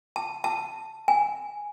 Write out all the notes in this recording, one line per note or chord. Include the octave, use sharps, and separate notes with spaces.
A5
A5
G#5